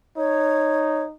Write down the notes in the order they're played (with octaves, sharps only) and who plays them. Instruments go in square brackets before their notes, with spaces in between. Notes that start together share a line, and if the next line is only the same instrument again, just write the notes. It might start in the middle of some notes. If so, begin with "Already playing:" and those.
[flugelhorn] D#4 [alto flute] C#5